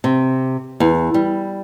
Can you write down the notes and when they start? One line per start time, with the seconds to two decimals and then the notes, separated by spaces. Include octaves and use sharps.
0.04 C3
0.80 E2
1.14 G3